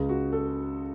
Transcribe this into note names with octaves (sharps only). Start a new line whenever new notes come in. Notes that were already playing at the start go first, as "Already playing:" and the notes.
Already playing: C#2 C#3 G#3
F#4
A4